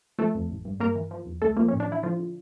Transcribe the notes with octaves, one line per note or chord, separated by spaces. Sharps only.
F3 A3 A4
F2
A1
G2
G2 A#3 A#4
E3
F3
E2
C#2 A3 A4
F3 A#3
A2 C#4
D4
E3 E4
D3 F3 F4
D3